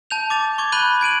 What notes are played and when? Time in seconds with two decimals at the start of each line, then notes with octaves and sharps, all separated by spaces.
0.11 A5 G6 F7
0.30 D6 A6 F7
0.58 C#6 D6 G#6
0.72 B5 F#6 G6 D#7 G7
1.01 G#6 D7 D#7 F#7